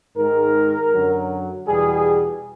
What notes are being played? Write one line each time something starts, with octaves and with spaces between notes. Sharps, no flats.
G#2 D#3 G#3 A#4
F#2 D3 F#3
E2 B2 G3 G#4